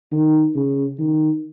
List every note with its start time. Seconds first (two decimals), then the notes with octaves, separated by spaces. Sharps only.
0.12 D#3
0.55 C#3
0.99 D#3